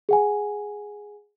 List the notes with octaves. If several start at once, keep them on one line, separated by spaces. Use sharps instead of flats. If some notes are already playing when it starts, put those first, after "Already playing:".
G#4 F#5 G#5